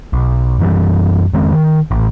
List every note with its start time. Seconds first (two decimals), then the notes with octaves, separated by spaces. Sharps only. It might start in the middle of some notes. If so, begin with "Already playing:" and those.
0.13 B1
0.59 F#2 E3 G3
1.33 F2 D#3 G#3 C4
1.52 D#3
1.91 A1